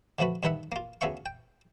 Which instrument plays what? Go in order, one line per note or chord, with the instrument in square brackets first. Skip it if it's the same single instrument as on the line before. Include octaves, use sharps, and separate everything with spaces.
[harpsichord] D3 F3 A3 F#4 B4
G2 D3 D#3 B4 E5 F#5
A#3 F4
D2 C#3 B3 E5 F5 C#6
G5